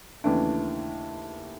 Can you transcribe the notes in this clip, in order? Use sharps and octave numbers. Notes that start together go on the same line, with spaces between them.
D#2 C#3 E3 A3 D4